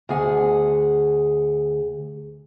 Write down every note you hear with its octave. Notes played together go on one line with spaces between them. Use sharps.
D2 G#4 F#5